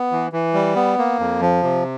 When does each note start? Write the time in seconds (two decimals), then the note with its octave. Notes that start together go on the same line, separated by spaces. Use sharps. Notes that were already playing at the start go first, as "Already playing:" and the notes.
Already playing: B3
0.12 E3
0.33 E3
0.54 G3
0.76 B3
0.98 A#3
1.19 F2
1.41 F3
1.63 C3